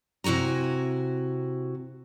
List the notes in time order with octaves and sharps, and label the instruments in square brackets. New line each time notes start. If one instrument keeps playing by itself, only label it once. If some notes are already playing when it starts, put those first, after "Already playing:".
[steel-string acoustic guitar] C3 E4 F#4 G#5 A#5